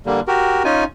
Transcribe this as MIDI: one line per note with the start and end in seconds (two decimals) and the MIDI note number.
0.06 0.20 50
0.06 0.20 55
0.06 0.20 58
0.28 0.63 66
0.28 0.63 67
0.28 0.63 70
0.64 0.84 61
0.64 0.84 63
0.64 0.84 65
0.64 0.84 80